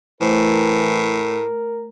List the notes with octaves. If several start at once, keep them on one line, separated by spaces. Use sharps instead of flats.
A2 E3 A3 A#4 C5